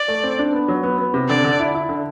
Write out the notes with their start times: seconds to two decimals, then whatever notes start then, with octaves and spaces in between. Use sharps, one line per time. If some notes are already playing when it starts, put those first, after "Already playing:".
Already playing: D5
0.08 A3
0.24 C4
0.39 D4
0.53 B3
0.68 F#3
0.83 B3
0.98 B3
1.14 C3
1.29 D3 D5
1.44 D3
1.60 E4
1.75 E4
1.89 D3